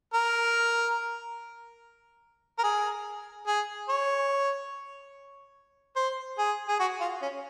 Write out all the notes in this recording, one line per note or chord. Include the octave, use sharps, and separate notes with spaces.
A#4
A#4
G#4
G#4
C#5
C5
G#4
G#4
F#4
F4
C#4